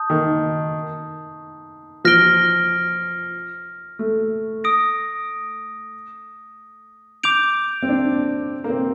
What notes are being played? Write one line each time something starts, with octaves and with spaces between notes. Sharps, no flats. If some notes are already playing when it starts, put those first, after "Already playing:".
Already playing: A5 D#6 G6
D#3
F3 F6 A#6 D7 G7
A3
D#6 A#6 D7
D6 G6 D7 F7
C4
D4
A#3
C4